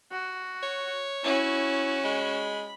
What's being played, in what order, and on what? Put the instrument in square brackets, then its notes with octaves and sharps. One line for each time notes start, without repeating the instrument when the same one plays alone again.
[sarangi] F#4
[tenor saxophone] C#5
[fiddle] C#4 F#4 [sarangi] E4
[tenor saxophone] G#3 [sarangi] B5